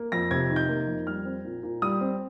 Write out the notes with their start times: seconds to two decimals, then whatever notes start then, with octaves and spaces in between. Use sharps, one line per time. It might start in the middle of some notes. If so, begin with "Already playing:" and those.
Already playing: A#3
0.12 F2 A#6
0.31 C3 G#6
0.50 D#3
0.56 G6
0.69 A#3
0.87 F2
1.07 G3 F6
1.25 C4
1.45 A#2
1.63 A#2
1.82 G3 D#6
2.01 C4